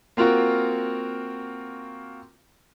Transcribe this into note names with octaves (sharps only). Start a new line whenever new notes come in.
A#3 C4 F4 F#4 A#4